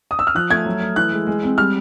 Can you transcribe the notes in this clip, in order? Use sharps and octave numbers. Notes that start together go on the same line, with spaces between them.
D#6
E6
F6
F3 F#6
A3 G#6
F#3
A3
E3 F#6
G#3
G#3
C4
G3 F6